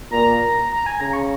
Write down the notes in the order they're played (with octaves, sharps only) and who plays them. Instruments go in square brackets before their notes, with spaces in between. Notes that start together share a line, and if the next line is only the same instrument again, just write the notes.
[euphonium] A#2 [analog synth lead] A#5
[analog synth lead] A#5
G#5
[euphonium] C#3 [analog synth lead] A#5
[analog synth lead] C#6